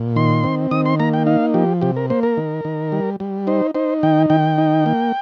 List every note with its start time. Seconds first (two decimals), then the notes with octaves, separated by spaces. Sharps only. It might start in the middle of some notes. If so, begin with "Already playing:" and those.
Already playing: A#2
0.16 D#3 C6
0.44 C4
0.71 D#3 D#6
0.86 C6
1.00 A#3 A#5
1.14 G5
1.26 D#4 F5
1.54 F3 G4
1.82 C3 G4
1.96 A#4
2.10 A#3 C5
2.23 A#4
2.37 D#3
2.65 D#3
2.92 G3
3.20 G3
3.47 D#4 C5
3.75 D#4 C5
4.03 D#3 G5
4.30 D#3 G5
4.58 D#4
4.86 A#3